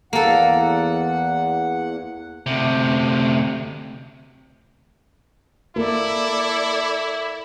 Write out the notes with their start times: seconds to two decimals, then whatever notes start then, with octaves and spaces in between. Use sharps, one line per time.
0.13 E2 A#3 A4 F#5
2.46 D2 C3
5.76 A#3 E4 A4 D5